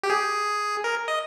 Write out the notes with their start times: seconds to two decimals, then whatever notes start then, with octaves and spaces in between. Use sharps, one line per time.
0.03 G4
0.10 G#4
0.84 A#4
1.08 D#5